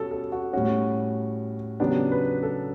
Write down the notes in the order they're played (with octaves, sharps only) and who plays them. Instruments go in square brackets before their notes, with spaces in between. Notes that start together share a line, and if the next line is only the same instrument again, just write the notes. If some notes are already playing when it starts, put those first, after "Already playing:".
Already playing: [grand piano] B2 G3 C#4 A4
A4
F#4
A2 G3 C#4 F#4
C#3 F#3 B3 D4 G4
B4
A4